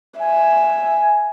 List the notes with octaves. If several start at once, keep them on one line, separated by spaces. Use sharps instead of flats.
E5 G#5